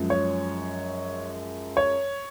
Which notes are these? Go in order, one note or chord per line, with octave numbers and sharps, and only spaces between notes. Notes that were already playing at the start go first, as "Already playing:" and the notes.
Already playing: F#2 F3 G#3
C#5
C#5